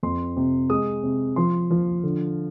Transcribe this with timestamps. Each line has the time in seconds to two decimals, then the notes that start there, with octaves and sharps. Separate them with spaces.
0.03 F2 C6
0.37 C3
0.70 G#3 D#6
1.03 C3
1.36 F3 C6
1.71 F3
2.03 D3